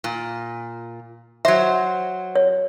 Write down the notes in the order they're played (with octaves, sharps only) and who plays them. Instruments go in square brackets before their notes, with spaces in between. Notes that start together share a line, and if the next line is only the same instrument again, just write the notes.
[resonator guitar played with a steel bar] A#2
[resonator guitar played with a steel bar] F#3 C5 [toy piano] E5
[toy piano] C#5